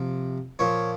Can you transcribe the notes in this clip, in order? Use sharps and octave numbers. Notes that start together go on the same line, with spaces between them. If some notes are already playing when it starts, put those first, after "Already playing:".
Already playing: C3 F3
A#2 F3 C#5